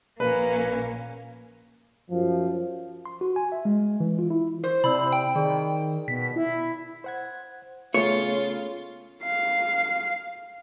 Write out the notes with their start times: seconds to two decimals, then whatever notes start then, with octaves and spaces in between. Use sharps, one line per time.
0.20 A#1 A#3 C#4 B4
2.10 F#2 F3
3.05 C6
3.21 F#4
3.36 G#5
3.52 E5
3.65 G#3
4.00 E3
4.19 F4
4.30 E4
4.64 C5
4.84 C3 E4 D5 B5 E6
5.13 G5
5.35 D#3 G#4 D5
6.08 B2 B6
6.36 E4
7.04 C5 F#5 G#6
7.94 C#3 A3 B3 F4 C#5
9.24 F5 C7